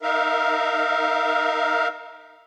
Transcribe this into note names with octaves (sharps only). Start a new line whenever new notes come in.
D#4 A#4 E5 F5